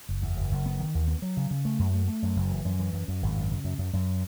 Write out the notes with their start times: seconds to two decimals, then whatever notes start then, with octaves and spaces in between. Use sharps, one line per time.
0.09 F#1
0.22 E2
0.36 F#1
0.51 F#1
0.66 B3
0.80 D#3
0.95 D#2
1.08 B3
1.22 F#3
1.37 C#3
1.51 C#3
1.65 A3
1.79 F#2
1.93 A3
2.08 A3
2.22 F#2
2.36 F#1
2.50 E3
2.65 F#2
2.80 E3
2.93 F#2
3.08 F#2
3.22 G#1
3.37 F#2
3.50 C#3
3.64 F#2
3.79 F#2
3.93 F#2